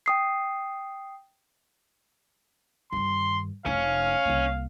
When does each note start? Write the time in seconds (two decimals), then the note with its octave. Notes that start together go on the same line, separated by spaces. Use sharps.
0.06 G5 D#6 C7
2.92 G2 D#3 C6
3.66 F1 C#4 E4 F5
4.25 C2 A#3